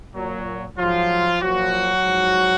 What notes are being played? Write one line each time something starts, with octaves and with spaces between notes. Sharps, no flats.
A#2 F#3
G#2 F3 F#3 F4
A#2 F3 F#3 F#4
G#2 F3